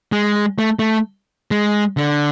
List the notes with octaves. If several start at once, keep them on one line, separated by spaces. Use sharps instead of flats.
G#3
A3
A3
G#3
D3